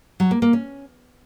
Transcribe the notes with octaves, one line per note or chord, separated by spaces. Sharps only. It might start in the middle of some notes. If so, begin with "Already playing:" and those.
F#3
A#3
A#3
C#4